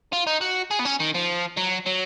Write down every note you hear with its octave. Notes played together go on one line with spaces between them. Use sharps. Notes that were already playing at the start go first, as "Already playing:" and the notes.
F4
D#4
F#4
G#4
B3
C#4
D#3
F3
F#3
F#3